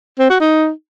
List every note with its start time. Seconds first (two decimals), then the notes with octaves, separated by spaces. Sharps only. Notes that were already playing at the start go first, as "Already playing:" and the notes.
0.19 C4
0.30 F#4
0.41 D#4